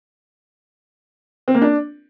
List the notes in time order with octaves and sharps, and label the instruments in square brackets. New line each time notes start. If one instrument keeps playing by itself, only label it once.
[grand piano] C4
A#3
D4